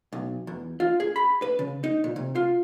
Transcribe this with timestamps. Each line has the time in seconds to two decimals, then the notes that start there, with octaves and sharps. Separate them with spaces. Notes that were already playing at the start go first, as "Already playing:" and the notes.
0.12 B1
0.47 E2
0.80 F4
1.00 G#4
1.16 B5
1.42 B4
1.59 C#3
1.84 D#4
2.04 A#2
2.16 C3
2.35 F4